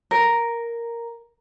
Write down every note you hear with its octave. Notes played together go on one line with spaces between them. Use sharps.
A#4